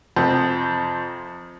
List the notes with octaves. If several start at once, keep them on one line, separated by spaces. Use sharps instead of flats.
F2 C3 C5